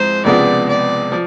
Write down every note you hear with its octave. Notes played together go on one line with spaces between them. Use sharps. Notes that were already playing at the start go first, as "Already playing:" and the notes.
Already playing: G#2 F3 G#3 C4 E4 C5
C#2 C3 F3 G#3 B3 D5
D5
F3